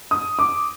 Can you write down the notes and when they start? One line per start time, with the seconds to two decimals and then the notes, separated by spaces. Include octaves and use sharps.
0.11 D#6
0.39 D6